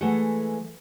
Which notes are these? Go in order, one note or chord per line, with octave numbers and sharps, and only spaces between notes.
E3 G#3 A3 A4 F#5